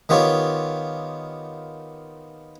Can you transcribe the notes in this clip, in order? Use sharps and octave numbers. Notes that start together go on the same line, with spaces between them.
D#3 B3 F4 G4 C#5